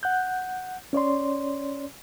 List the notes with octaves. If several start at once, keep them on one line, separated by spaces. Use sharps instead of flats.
F#5 F#6 G6
C#4 C#5 D5 C6